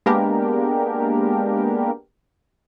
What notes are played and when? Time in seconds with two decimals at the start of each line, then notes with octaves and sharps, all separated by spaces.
0.06 G#3 A#3 B3 D4 G4 A#4